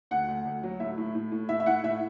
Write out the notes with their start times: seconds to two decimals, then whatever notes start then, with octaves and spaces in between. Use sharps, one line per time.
0.11 D2 F#5
0.28 D2
0.45 D2
0.63 F#3
0.80 A2 E5
0.98 A2
1.15 A2
1.32 A2
1.49 A2 E5
1.60 E5
1.66 E4 F#5
1.83 A2 E5